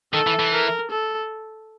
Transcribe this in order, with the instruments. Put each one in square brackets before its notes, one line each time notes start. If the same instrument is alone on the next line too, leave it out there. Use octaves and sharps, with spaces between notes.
[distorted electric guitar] D#3 [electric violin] A4
[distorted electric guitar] E3
E3
[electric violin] A#4
A4